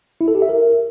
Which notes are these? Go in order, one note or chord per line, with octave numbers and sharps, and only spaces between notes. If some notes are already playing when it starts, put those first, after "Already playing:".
E4
A4
G4
E5
A#4